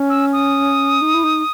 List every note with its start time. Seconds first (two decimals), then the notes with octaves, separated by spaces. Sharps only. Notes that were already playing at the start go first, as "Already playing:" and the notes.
Already playing: C#4
0.10 E6
0.33 D#6
1.02 D#4
1.14 E4
1.23 D#4